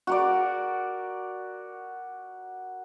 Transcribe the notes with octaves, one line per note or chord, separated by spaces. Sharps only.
F#4 A#4 D5